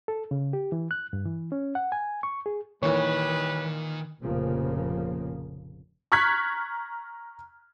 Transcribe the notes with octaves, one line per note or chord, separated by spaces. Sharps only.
A4
C#3
G4
E3
F#6
G2
E3
C#4
F#5
G#5
C#6
G#4
A#2 D#3 E3 G3 B4 C#5
F1 A#1 C#3 F3 A#3
A#5 C#6 F6 F#6 G#6 B6